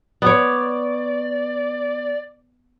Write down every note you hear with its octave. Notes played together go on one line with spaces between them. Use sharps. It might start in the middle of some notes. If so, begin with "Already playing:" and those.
B3 C#5 D5